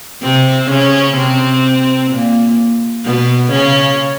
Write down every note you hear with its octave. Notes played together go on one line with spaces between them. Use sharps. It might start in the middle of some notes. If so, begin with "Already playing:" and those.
C3 C4
C#3 C#4
C3 C4
A#2 A#3
B2 B3
C#3 C#4